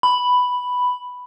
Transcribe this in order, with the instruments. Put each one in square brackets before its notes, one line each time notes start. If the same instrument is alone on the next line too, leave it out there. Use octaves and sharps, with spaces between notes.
[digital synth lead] B5